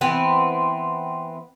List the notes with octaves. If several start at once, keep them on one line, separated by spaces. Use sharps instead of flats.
E3 B3 C4